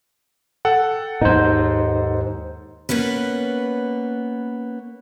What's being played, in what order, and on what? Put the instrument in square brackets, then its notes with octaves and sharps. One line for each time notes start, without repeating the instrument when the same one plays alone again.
[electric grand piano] A4 F#5 G5
[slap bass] D#2 G#2 [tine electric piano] D#4 C5
[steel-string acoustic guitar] A#3 B3 C#4 B4